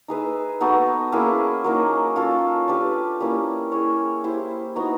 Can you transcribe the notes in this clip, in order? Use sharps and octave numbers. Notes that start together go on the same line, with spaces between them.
D#4 G#4 B4 E5
B3 D#4 F#4 A4
A#3 C#4 E4 G#4
F#3 A#3 D#4
C#4 F4 A4 C#5
D4 G4 B4
G3 A#3 C#4 E4
E4 G#4 C#5
E4 G4 C5
B3 D#4 F#4